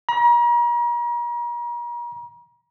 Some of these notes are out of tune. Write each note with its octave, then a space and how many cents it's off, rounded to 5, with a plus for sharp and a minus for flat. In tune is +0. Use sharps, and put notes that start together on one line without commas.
A#5 +40